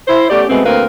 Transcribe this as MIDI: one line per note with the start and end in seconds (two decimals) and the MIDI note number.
0.08 0.26 64
0.08 0.26 72
0.29 0.45 57
0.29 0.45 59
0.29 0.45 61
0.29 0.45 67
0.29 0.45 74
0.49 0.62 47
0.49 0.62 56
0.49 0.62 57
0.49 0.62 59
0.49 0.62 60
0.65 0.83 38
0.65 0.83 58
0.65 0.83 60
0.65 0.83 70
0.65 0.83 71
0.65 0.83 77